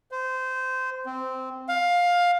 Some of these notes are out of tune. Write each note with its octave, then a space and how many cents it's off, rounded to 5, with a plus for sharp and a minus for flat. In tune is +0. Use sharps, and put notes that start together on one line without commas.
C5 -20
C4 -10
F5 +15